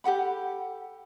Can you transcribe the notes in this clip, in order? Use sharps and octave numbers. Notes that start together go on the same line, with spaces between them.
G4 A4 F#5 B5